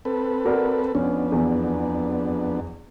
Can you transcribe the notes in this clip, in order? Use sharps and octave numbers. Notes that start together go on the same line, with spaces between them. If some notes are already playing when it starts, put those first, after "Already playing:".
C4 A4 B4
F#4 A#4 D5
F2 B3 C#4 D4
E2